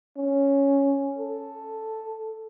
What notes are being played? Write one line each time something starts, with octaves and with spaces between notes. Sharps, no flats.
C#4
A4